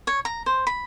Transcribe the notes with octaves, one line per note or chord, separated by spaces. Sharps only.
C#5
A#5
C5
B5